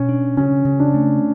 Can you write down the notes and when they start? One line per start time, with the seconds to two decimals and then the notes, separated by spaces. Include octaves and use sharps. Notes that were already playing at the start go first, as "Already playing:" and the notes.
Already playing: B2 C#4
0.09 D4
0.37 C#3 C#4
0.65 C#3
0.80 D4
0.94 A3